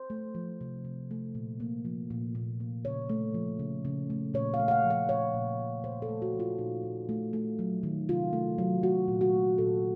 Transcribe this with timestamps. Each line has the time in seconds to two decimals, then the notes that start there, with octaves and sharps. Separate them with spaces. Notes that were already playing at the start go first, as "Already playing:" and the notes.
Already playing: C5
0.10 A3
0.35 F3
0.61 C3
0.85 C3
1.11 A3
1.35 A#2
1.60 A#3
1.85 F3
2.10 A#2
2.35 A#2
2.60 A#3
2.85 C#3 C#5
3.09 A3
3.34 F3
3.59 C#3
3.85 C#3
4.10 A3
4.34 A#2 C#5
4.54 F5
4.60 A3
4.68 F5
4.71 F#5
4.85 F3
4.90 F5
5.09 A#2 C#5
5.34 A#2
5.59 A3
5.84 A#2 C5
6.02 A4
6.09 A3
6.22 F#4
6.34 F3
6.40 F4
6.58 A#2 D#4
6.83 A#2
7.09 A3
7.33 A3
7.59 F#3
7.83 D#3
8.09 C3 F4
8.33 A3
8.58 F#3
8.83 A3 F#4
9.08 A#2
9.21 F#4
9.33 A3
9.58 A#2 A4